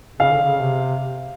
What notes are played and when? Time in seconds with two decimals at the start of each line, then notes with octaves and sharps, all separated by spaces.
0.20 C#3 F5
0.31 D3
0.42 C#3
0.59 C3